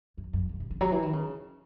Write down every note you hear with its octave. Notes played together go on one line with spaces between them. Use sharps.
F#2
F#2
G#2
C3
C#3
F#3
E3
D#3
C#3